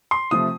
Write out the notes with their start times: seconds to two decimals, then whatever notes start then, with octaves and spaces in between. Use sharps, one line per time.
0.11 C6
0.31 C3 F3 A3 D#6